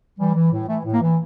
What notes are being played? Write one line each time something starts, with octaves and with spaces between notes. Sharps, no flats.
E3 G3
E3
A2
E3 A3
A2
A#3
E3